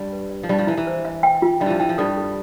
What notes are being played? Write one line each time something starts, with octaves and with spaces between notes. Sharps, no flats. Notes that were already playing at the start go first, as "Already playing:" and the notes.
Already playing: G2 G3
B4
D5
F3
G2 G3 A5
F3
E3 E4
E3
C5
E5
G5
F4
G2 G3 E5
E3 F3
E3 G5
F3
G2 G3 A4
A4